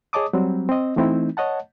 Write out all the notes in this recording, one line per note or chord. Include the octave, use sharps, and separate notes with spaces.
G#4 C#5 D#5 A5 D6 D#6
F#3 G3 C4
C4 D#5
E3 A3 C4 D#4 E4
C#5 D#5 F#5 A5